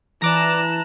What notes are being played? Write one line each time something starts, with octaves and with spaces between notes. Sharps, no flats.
E3 D5 A5 A#5 D6 F#6 A#6 E7